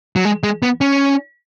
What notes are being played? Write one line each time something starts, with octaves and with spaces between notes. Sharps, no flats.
F#3
G#3
G#3
B3
C#4